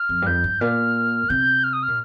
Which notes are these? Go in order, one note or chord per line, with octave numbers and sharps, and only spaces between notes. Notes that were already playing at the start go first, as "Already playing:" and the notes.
Already playing: F6
F2
G2
F2 G6
G2
A#2 F6
C3 G6
F6
D#6
A#2 F6